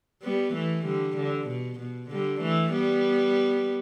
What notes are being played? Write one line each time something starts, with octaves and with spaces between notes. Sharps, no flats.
G3 B3
E3 A3
D3 G3
D3
B2
B2
D3 G3
E3 A3
G3 B3